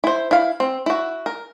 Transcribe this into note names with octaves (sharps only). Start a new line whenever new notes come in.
E4 C5
E4 F5
C4
E4 F#4
A#4